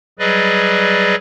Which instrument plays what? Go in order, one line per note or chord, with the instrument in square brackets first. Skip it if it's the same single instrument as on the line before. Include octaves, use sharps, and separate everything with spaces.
[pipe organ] F#3 G3 G#4 B4 D5 D#5